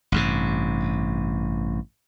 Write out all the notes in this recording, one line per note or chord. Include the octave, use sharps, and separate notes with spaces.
A1 G2 C3